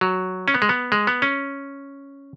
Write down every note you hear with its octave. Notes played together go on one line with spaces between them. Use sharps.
F#3
C#4
B3
G#3
B3
G#3
B3
C#4